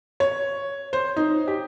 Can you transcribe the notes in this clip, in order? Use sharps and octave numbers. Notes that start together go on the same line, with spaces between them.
C#5
C5
D#4
G4